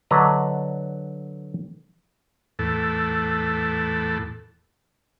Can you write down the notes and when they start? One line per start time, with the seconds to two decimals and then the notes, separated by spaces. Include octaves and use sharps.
0.11 D3 F#3 D4 B4 D#5 A#5
2.59 E2 A2 A4